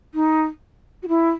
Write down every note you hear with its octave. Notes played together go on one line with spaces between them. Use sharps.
D#4
F#4
E4